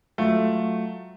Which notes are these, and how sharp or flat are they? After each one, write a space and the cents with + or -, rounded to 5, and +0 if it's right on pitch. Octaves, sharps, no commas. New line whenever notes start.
F#3 +0 A3 +0 F4 +0